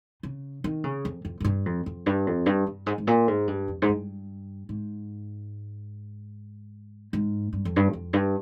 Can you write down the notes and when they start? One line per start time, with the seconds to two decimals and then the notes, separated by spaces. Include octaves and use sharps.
0.23 C#3
0.64 D#3
0.84 C#3
1.05 F2
1.25 F2
1.40 F2
1.45 G2
1.66 F2
1.86 F2
2.06 G2
2.27 F2
2.46 G2
2.67 G2
2.86 G#2
2.98 G#2
3.07 A#2
3.28 G#2
3.47 G2
3.68 F2
3.82 G#2
3.88 G2
4.69 G#2
7.13 G#2
7.53 G2
7.65 F2
7.76 G2
7.93 F2
8.13 G2